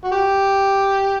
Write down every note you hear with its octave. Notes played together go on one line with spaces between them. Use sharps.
F#4
G4